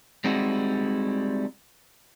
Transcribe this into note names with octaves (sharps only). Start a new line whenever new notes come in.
G3 G#3 C4 D#4 E4 F#4